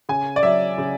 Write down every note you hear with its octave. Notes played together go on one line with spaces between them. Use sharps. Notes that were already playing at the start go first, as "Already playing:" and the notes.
C#3 G#5
D5
F#3 E5
C#3